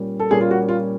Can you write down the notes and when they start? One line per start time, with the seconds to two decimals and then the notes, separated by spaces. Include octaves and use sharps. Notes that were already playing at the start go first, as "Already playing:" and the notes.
Already playing: A#2 G3 A#3 C#4
0.19 A4
0.31 A#2 G3 A#3 C#4 G#4
0.41 F4
0.51 F#4
0.69 F4